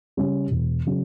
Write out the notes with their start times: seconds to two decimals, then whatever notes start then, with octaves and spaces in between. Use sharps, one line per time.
0.17 C#3 G3 C#4
0.51 E1
0.86 C#3 F#3